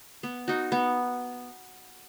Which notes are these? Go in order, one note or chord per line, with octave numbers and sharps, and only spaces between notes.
B3
D#4 F#4
B3